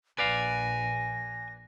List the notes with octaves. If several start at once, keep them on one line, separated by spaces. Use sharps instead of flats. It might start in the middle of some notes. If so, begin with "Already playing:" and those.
A#1 B4 D5 F5 G#5 A#6